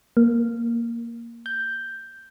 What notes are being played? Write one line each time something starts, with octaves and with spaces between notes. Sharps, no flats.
A#3
G6